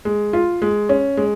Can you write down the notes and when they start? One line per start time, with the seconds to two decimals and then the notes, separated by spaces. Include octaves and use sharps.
0.05 G#3
0.33 F4
0.62 G#3
0.89 C#4
1.17 G#3